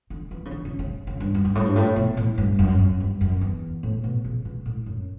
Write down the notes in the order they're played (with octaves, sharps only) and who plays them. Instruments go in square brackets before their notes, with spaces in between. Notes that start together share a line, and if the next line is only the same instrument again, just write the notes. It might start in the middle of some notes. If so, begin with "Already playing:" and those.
[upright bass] D3
E3
C#3
D3
C#3
C#3
C#3
G2
F#2
G2
A2
G2
A2
B2
A2
G2
F#2
F#2
G2
F#2
E2
A2
B2
C#3
B2
A2
F#2